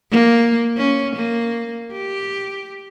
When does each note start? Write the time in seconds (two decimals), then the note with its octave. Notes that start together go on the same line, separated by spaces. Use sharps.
0.11 A#3
0.77 C#4
1.16 A#3
1.92 G4